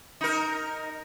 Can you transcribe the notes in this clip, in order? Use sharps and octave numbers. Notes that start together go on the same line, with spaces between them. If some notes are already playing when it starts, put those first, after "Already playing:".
D#4 A#4